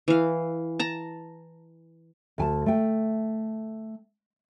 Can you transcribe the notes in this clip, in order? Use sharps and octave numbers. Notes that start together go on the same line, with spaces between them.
E3 F5
A5 A#5
D2 G#5 A5
A3 G5